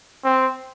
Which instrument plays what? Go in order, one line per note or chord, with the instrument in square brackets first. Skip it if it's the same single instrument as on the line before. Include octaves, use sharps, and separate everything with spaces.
[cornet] C4